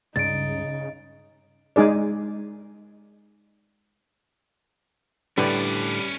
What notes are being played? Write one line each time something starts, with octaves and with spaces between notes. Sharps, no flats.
C#2 G2 C#3 D#4 A6 D7
G#3 D#4 G#4 D5
A2 D3 G3 C#4 B4 D5